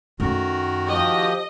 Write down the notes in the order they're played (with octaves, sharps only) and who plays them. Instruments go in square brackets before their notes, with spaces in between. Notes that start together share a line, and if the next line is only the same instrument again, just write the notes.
[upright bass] F#2 A3 [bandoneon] D#3 F#4 A#4
[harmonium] F3 G4 [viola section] D#5